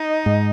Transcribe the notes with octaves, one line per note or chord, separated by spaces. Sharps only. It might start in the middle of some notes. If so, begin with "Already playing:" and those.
Already playing: D#4
G#2